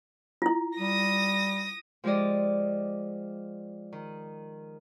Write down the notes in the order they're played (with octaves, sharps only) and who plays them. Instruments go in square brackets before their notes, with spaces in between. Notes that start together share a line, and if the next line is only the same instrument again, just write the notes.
[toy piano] E4 F4
[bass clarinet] G3 [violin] D#6 A#6
[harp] F3 G#3 F4 G4 D5 D#5
D#3